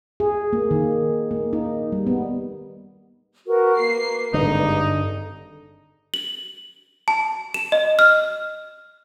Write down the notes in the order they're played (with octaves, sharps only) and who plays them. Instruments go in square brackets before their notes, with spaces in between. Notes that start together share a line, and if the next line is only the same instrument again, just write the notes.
[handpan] G#4
A#3
D#3
A#3
D#4
G3
B3
[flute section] F#4 A#4 B4
[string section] A#3 C7 [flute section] B4
[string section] G#1 G2 [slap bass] D3 [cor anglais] D#4
[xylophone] F#7
A5
E7
D#5
F6